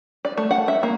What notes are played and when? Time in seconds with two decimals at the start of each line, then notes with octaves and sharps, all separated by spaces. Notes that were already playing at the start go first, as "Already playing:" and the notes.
0.25 D5
0.37 A3
0.51 F#5
0.68 E5
0.83 A#3